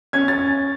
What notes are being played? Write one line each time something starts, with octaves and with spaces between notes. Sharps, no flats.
C#4 G#6
A6